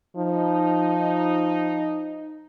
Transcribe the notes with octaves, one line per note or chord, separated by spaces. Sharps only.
F3 D#4